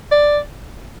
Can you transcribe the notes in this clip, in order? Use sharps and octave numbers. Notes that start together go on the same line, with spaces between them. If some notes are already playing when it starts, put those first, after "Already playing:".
D5